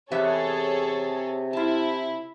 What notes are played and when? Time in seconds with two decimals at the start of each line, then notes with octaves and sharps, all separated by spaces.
0.11 E2 C3 B3 G#4 A4 C#5 E5
1.53 E4 F4 A5